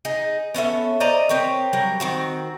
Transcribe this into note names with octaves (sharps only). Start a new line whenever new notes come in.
D#4 G#4
B3 C#4 A4 E5
C5 D5 D#5 A#5
C4 G4 A#4 C#5
F#3 G3 A#4
D#3 C4 F#4